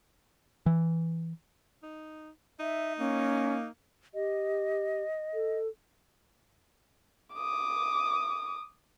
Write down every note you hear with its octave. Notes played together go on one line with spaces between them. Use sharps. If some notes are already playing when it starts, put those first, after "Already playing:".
E3
D#4
D#4 E5
A#3 C#4
G4 D#5
A4
D6 D#6